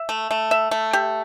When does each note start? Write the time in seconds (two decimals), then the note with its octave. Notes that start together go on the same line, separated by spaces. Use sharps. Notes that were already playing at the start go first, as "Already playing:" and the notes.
Already playing: E5
0.09 A3
0.31 A3
0.51 E5
0.71 A3
0.93 G4